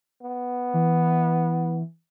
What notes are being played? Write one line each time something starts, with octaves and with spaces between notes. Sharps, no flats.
B3
E3